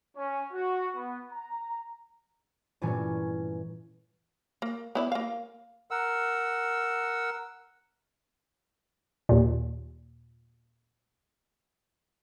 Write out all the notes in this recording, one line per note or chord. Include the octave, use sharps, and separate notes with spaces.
C#4
F#4
B3
A#5
G2 A#2 E3 A3 C#4
A#3
B3 E4 D5
A#3 F5
A#4 F#5 E6
D#2 A#2